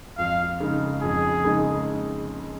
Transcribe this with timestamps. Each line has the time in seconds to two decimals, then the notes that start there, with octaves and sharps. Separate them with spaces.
0.18 F2 F5
0.60 C#3 G#3 D#4
1.01 F2 G#4
1.44 C#3 G#3 D#4